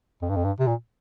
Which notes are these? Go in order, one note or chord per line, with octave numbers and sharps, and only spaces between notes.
F2
G2
F2
G2
C3
A#2